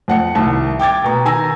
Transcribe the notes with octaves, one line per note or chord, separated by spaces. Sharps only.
F2 F#5 C#7
C2 D#3 A5
G5 D6 G#6 A6
B2 A#5
D#3 G#5 A#5 E6 A#6